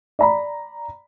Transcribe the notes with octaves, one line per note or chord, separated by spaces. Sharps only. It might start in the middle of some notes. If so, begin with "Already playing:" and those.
D5 A#5 B5